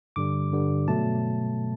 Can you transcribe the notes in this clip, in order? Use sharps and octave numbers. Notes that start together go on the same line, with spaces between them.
G2 D3 G3 D6
G2 D3 G3
B2 F#3 A3 A5